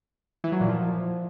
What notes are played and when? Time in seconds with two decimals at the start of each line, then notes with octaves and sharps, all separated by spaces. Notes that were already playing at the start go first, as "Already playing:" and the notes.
0.44 E3
0.52 F#3
0.61 A#2
0.69 F3